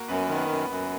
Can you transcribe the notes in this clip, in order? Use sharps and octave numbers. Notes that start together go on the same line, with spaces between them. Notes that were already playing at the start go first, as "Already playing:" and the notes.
Already playing: A#3 F#4 A#4
F#2 B3 B4
D#3
B3 B4
F#2
F#2